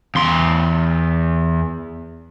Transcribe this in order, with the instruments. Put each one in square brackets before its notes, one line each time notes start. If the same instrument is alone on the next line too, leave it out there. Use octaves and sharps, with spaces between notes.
[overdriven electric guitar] E2 C6